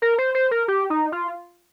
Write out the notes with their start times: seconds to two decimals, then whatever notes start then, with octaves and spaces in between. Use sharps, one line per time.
0.02 A#4
0.18 C5
0.35 C5
0.51 A#4
0.68 G4
0.90 D#4
1.12 F4